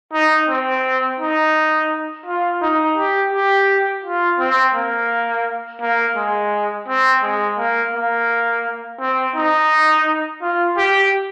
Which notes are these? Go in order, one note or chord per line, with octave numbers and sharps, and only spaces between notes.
D#4
C4
D#4
F4
D#4
G4
G4
F4
C4
A#3
A#3
G#3
C4
G#3
A#3
A#3
C4
D#4
F4
G4